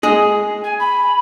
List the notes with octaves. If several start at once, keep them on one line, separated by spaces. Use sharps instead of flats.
G#4 D#5
G#5
B5